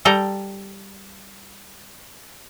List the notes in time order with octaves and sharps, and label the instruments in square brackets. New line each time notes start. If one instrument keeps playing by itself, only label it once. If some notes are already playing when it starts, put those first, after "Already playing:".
[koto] G3 A4 G5 A#5